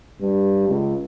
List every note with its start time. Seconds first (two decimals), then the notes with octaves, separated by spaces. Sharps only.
0.21 G2
0.68 C#2